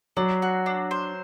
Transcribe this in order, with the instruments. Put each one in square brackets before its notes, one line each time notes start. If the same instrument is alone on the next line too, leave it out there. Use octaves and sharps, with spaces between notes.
[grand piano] F#3 [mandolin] D4
[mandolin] F#4
D4
C5